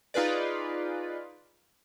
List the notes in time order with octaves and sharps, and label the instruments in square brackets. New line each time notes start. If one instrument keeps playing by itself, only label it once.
[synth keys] D#4 F4 G#4 B4 D5